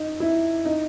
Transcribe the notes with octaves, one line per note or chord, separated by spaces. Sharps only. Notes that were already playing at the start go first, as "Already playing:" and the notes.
Already playing: D#4
E4
D#4